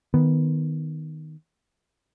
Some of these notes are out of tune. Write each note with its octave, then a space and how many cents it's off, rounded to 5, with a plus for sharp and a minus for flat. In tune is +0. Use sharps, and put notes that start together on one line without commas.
D#3 +0 B3 +0